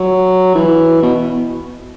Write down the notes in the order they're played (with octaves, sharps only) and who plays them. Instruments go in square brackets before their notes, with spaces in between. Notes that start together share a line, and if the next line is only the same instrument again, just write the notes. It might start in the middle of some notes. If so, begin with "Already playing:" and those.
Already playing: [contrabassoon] F#3
E3
B2